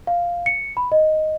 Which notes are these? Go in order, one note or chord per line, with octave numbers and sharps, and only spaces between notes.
F5
C#7
B5
D#5